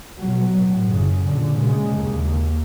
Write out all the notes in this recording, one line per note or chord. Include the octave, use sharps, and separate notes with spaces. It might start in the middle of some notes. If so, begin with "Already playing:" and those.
B2 F#3
A2
F#2 C#3
A#2 D3
C#3 G#3
D#2 A#3